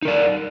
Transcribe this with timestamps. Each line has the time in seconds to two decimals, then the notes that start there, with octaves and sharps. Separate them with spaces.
0.02 D#4
0.05 A#4
0.08 D5